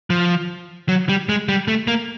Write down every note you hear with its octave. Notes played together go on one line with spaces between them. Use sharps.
F3
F#3
G3
G#3
G3
A3
A#3